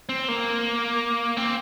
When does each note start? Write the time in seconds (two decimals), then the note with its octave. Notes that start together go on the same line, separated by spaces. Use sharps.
0.09 C4
0.28 A#3
1.37 C4